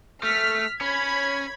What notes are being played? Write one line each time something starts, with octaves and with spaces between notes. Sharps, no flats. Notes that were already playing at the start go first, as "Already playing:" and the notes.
A3 F6 B6
C#4 C#5 B5 G#6